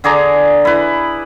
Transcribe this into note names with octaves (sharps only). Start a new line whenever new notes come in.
D3 G#4 D5 A#5
E4 B4